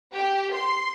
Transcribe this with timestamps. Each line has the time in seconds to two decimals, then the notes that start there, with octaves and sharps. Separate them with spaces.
0.14 G4
0.53 C6